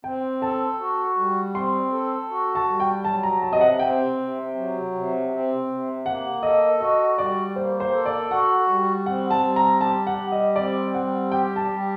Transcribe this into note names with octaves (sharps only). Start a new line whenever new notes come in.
C4 G5
A4 A5
F#4
G3
C4 C6
A4
F#4
A5
G3
G5
F#3 A5
A#5
C3 A5
D#5
F#5
C4 G5
C3
F#3
C3
C4
C3
A#3 F#5
A4 D#5
F#4 D#5
G3 D5
A#3 C5
C5
A4
D5
F#4 F#5
G3
C4 F#5
A5
G3
A#5
G4 A5
F#5
G3
D#5
C4 D5
G3 F#5
G4 G5
A5
G3